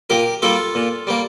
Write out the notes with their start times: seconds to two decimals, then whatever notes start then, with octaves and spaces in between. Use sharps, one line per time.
0.10 A#2 G4 A#4
0.42 G3 A#3 F4 A4
0.75 A#2
1.07 G3 A#3